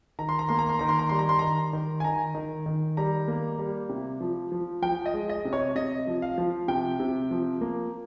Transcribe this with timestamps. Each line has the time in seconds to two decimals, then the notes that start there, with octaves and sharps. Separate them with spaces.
0.19 D#3 A#5
0.29 C6
0.39 A#5
0.49 A#3 C6
0.59 A#5
0.69 C6
0.79 D#3 A#5
0.89 C6
0.99 A#5
1.09 G3 C6
1.19 A#5
1.29 C6
1.39 D#3 A#5
1.73 D#3
2.00 G#5
2.04 D#3 A#5
2.35 D#3
2.66 D#3
2.97 G3 A#5
3.28 A#3
3.59 G3
3.89 C3
4.20 F3
4.52 F3
4.82 F3 G5
5.06 D#5
5.14 G#3
5.29 D#5
5.45 C3
5.53 C#5
5.75 C3 D#5
6.07 F3
6.22 F5
6.38 F3
6.68 C3 G5
7.00 C3
7.31 F3
7.61 A#3